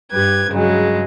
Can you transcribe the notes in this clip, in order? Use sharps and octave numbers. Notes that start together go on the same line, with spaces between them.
G2 G4 B4 G#6
G2 C#3 F#3 G#3